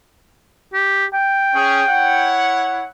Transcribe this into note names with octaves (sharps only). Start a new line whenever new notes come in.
G4
G5
C#4 G#4
E4 C#5 F#5